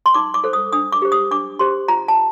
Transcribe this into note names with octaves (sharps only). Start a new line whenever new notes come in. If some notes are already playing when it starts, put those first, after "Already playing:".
C6
D#4 D6
D6
A4 C5
D#6
D4 D#6
D6
G4 C5
D#6
D4 D6
G4 C5 C6
F4 A#5
A5